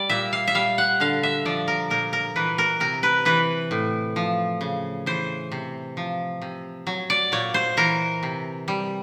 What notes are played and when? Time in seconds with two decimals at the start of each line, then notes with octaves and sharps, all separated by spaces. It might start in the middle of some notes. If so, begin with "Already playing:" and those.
Already playing: G3 D5
0.09 A#2 E5
0.33 F5
0.48 E5
0.55 G3 F5
0.78 F#5
1.00 D3 F5
1.23 E5
1.45 F3 D5
1.68 A#4
1.90 A#2 A#4
2.13 A#4
2.36 E3 B4
2.58 A#4
2.80 C3 A#4
3.03 B4
3.25 E3 B4
3.71 A2
4.16 F3
4.61 C#3
5.06 E3 C5
5.52 C3
5.97 F3
6.42 C3
6.87 F#3
7.10 D5
7.32 A#2 C#5
7.54 C5
7.77 E3 A#4
8.23 C3
8.68 G3